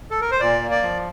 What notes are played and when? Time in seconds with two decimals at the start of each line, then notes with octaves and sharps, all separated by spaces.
0.11 A4
0.21 A#4
0.31 C5
0.40 A#2 D5
0.61 A#3
0.71 D5
0.82 F3